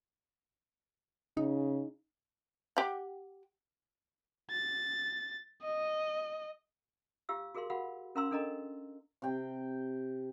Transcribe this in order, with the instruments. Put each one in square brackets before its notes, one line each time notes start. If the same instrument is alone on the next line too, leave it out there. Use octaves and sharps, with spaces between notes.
[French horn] C#3 [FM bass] D#4
[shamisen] G4 F#5
[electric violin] A6
D#5
[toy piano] F4 G4 F5 E6
F#4 G#4 A#4 F5 C6
F#4 A#4 F5 F#5 B5
C#4 A#4 F5 A#5 C6 E6
D4 A4 A#4 D#5 A#5
[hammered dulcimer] C3 G5